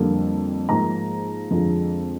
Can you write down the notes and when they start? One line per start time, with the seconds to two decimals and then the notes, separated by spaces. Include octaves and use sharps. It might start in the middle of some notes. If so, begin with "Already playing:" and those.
Already playing: F2 D3 G3 A#3
0.69 G#2 F3 A#3 A#5
1.51 F2 D3 F3 G#3